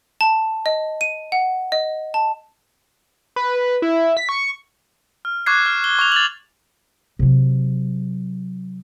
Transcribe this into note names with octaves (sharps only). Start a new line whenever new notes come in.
A5
D#5
D#7
F#5
D#5
A5
B4
E4
B6
C#6
F6
C#6 D6 F#6 G#6 C7
F6
G7
C#6 F7
A6 F7 F#7
C3 F#3